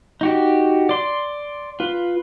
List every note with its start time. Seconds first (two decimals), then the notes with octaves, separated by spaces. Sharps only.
0.21 D#4 F#4 G4
0.89 D5 C6
1.80 F4 B4